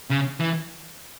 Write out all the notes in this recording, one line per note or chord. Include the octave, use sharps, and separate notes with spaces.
C#3
E3